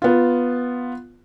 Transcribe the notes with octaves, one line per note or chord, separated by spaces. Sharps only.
B3 F4